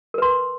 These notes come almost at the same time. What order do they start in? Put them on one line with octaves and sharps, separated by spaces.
A#4 B4 C6